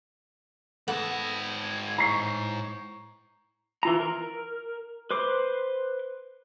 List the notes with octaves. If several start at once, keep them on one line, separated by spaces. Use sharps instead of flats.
G#2 B3 A4 A5
G#6
A2 A#5 C#6 C7
E3 F4 A#5
A#4
B4 C5 D6